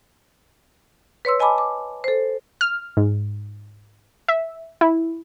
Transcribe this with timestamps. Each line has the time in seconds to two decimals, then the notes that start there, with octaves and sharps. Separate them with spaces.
1.25 B4 C#5 C6 E6
1.40 D#5 G#5 A5 B5 D6
1.58 D6
2.04 A4 C5
2.61 F6
2.97 G#2
4.28 E5
4.81 E4